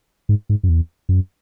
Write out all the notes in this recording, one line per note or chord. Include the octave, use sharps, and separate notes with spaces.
G#2
G#2
F#2
E2
F#2